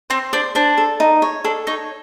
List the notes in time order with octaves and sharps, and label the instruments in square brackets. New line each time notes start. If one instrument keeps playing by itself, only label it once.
[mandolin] C4 [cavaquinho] C5
[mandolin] D4 [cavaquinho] C5
[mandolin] D4 [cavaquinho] C5
[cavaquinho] A4
D#4
C#5
[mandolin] D4 [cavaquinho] A4
[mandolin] D#4 [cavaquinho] C#5